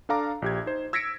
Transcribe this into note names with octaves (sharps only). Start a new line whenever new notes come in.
D4 A4 F5 A#5 D6
A#1 G4 G#6
D#4 C5
E6 G#6 A#6 B6 C#7 D7